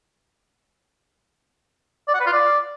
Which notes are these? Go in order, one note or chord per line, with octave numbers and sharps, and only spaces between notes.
D5
F#5
B4
F4
D5